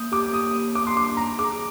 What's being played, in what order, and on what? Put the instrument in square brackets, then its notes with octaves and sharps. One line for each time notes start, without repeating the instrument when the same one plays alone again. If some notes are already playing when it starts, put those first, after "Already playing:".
Already playing: [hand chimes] A#3 [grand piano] D#6 G6
[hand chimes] G4 [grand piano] D6
[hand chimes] A#3 [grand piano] D#6
[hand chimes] A#3
[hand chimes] A#3 [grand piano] D6
[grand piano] C6
[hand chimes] D4 [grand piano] D6
[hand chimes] D#4 [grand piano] A#5
[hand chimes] G#4 [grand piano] D6